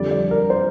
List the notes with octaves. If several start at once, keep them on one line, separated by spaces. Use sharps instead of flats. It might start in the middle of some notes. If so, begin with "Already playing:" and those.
Already playing: F2 D3 G3 D5
D5
A#4
C5